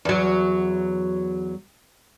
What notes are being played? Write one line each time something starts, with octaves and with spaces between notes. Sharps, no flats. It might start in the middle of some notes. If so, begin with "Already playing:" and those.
E2 F#3